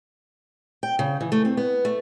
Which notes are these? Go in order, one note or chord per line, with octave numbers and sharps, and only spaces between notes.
G5
C#3
E3
A3
C4
B3
A3